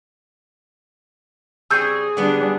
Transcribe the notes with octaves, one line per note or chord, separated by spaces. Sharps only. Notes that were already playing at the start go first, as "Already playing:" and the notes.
C#3 G3 C4 G#4 E6 G6
D3 G3 B3 D4